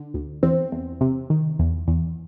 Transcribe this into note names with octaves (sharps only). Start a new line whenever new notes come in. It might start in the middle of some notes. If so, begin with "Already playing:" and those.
Already playing: D3
D2
E2 C4
E2
C3
D#3
E2
E2